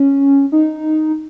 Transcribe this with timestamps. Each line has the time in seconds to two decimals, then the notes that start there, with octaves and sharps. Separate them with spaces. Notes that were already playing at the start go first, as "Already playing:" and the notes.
Already playing: C#4
0.52 D#4